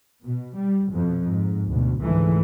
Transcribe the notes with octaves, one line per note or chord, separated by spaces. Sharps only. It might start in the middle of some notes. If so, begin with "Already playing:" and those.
B2
G3
F2 B2
G#2
D2 B2
C#2 G#2 D3 E3 A3